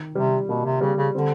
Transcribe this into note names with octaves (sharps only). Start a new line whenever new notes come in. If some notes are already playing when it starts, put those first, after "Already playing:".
Already playing: D#3
C3 G3
B2 A#3
C3
C#3 G3
C#3
D3 C4